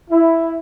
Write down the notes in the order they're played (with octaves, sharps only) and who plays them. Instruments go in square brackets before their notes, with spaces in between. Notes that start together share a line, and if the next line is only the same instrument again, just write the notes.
[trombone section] E4